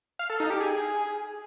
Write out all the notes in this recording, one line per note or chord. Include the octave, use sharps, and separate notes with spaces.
F5
A4
D#4
G4
G#4